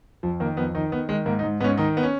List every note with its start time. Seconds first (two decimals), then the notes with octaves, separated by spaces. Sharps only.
0.23 F2 F3
0.40 D#3 A#3
0.57 F2 B3
0.75 D#3 D#4
0.92 D#3 B3
1.09 D#3 G#3
1.26 G#2 A#3
1.39 D#4
1.43 G#2
1.60 G#2 B3
1.64 C#4
1.77 D#3 D#4
1.97 B3
2.03 C#4